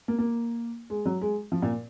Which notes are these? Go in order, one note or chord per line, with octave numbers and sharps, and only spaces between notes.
A#3
A#3
G#3
F#3
G#3
F3
A#2